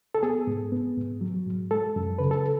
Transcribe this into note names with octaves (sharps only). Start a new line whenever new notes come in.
A4
B3 G#4
G#2
B3
G#2
F#3
G#2
G#3 A4
F#2
C#3 B4
A4